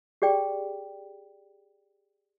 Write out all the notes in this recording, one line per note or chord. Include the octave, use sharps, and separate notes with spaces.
G4 G#4 D5 G5